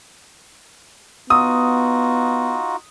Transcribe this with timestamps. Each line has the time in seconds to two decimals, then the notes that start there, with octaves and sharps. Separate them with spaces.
1.30 B3 D#4 F4 F#4 D#6